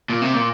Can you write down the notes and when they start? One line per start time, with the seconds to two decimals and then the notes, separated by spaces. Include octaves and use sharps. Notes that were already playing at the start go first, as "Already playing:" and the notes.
0.10 A#2
0.22 C3
0.34 A#2